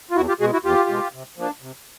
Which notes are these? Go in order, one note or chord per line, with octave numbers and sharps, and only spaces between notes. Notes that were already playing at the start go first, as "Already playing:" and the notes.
F4
E2 E4 F#4
F4 G4
B2 G#3 F#4 G#4
E4 F#4
E2 F4 G4
B2 G#3
C3
F3 A#3 D4
C3